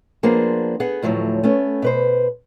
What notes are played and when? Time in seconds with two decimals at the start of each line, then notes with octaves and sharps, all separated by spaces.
0.23 F3 A#3 B3 D4 G#4 C5
0.80 B3 G#4 F#5
1.02 D2 A2 F3 F#3 C#5
1.44 A3 B3 C#4
1.82 B2 B4 C5